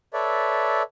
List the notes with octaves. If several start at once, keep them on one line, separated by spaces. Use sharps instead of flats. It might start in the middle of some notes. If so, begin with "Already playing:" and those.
A4 B4 C#5 D5 E5